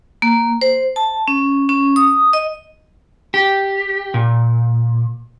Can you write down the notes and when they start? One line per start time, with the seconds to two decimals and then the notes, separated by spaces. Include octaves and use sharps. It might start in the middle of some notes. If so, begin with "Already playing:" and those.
0.22 A#3
0.61 C5
0.96 A5
1.28 C#4
1.69 C#4
1.96 D#6
2.33 D#5
3.34 G4
4.14 A#2